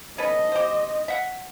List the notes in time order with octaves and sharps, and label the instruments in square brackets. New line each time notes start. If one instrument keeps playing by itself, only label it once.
[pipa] C#4 A4 B4 [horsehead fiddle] D#5
[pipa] G4 C5
E5 F#5